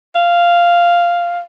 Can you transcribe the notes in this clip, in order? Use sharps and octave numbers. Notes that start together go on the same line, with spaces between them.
F5